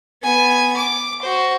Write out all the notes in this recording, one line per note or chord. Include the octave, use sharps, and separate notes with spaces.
B3 G#5
D6
F#4 C5